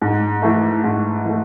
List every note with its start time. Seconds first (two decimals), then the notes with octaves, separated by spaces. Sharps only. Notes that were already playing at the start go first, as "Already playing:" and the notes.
0.02 G#2
0.42 E3 A3
0.84 G#2
1.25 E3 A3